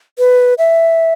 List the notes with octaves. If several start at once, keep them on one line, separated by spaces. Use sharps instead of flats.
B4
E5